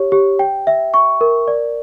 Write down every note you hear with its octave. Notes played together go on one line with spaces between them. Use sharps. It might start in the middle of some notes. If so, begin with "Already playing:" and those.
Already playing: G4 C#5
G4
G5
E5
C#6
A#4
D5